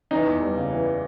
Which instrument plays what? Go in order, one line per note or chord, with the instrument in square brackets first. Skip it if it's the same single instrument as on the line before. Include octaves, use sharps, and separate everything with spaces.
[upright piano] E3 D#4
E2
G3
C#3
E3